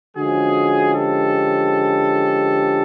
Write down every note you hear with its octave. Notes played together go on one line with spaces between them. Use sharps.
D3 F3 G#3 C#4 F#4 G#4
G4 A4